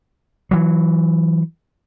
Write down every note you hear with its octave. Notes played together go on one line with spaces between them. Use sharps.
E3 F#3